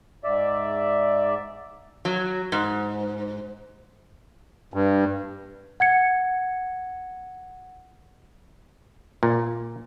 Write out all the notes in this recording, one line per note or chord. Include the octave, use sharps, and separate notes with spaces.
G#2 D5 E5
F#3
G#2
G2
F#5 G#6 C#7
A#2